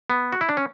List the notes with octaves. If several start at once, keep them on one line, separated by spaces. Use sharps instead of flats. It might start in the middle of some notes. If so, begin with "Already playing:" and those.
B3
F#4
E4
D4
C#4